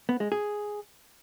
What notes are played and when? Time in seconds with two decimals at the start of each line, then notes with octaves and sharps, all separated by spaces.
0.09 B3
0.20 G#3
0.32 G#4